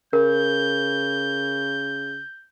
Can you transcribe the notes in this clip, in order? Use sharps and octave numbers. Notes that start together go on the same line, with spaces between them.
C#3 A#4 G6